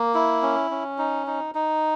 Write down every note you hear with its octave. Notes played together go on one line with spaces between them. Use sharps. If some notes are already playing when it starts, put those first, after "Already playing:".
Already playing: A#3
E4
C#4
C#4
D#4
D#4
D#4